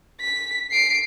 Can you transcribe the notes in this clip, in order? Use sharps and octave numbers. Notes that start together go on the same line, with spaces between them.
B6
C7 D7